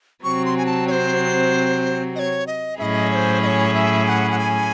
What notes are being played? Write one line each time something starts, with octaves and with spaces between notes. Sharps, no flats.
C3 F#3 C4 C#6
C6
G#5
A5
C#5
C5
D#5
C#5
D#5
A2 F#3 C#4 E4 G#4 D#5 E5
C#5
C5
D#5
C#5
E5
G#5
F#5
F#5
G#5